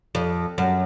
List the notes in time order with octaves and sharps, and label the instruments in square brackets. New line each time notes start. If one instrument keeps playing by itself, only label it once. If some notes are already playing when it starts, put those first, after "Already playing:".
[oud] F2
F#2